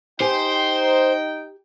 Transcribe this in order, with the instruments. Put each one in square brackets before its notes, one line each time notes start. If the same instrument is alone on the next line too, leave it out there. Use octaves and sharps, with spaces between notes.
[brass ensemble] D#4 G5 [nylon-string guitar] G4 G#5 [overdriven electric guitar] C5